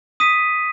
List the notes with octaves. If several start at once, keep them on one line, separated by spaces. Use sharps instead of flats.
D#6 B6 D#7